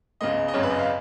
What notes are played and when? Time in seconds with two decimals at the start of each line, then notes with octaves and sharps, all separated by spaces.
0.21 C#2 C#3 G#3 B3 D#5
0.48 D#5
0.54 G#1 F#2 C#3 C#5
0.63 B4
0.71 D#5
0.79 F5